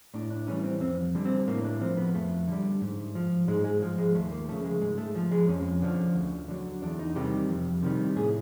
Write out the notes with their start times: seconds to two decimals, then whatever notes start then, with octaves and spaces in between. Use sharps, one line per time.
0.14 A2 D4
0.30 D4
0.47 E3 G3 C#4
0.64 C4
0.80 F2 C4
1.15 D3 G3
1.25 C4
1.48 A2 A#3
1.64 D4
1.81 F3 C4
1.97 B3
2.14 F2 A3
2.48 D3 G3
2.81 G#2
3.15 F3
3.48 G#2 G#3
3.64 G#3
3.82 F3
3.98 G#3
4.15 D#2 A3
4.31 A#3
4.48 C#3 F3 A3
4.65 G#3
4.82 G#2 G#3
4.98 A3
5.15 F3
5.31 G#3
5.48 F2 C#4
5.82 D3 F3
6.15 D2
6.48 D3 F#3
6.82 E2 D4
6.99 D#4
7.15 C3 D#3 G3 G4
7.49 F2
7.83 C3 D#3 G3
8.16 A2 G#4